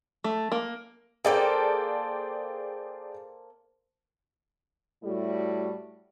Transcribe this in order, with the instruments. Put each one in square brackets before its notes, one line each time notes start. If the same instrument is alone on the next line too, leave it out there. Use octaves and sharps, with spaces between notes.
[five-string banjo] A3
A#3
[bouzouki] A#3 A4 C5 [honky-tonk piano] G#4 D5 G5
[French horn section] A2 G3 A3 E4 F#4